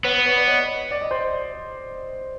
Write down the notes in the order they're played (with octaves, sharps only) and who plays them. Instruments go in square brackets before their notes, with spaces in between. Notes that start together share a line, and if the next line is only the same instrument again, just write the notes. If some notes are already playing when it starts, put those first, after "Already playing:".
[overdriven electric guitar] B3 [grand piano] B4 C#5
[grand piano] B4 C#5
D5
C#5 D#5
D5
D#5
C5 D5